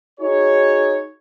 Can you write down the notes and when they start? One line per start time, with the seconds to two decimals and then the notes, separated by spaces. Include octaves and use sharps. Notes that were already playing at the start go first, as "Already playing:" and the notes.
0.20 D#4 F#4 G#4 C#5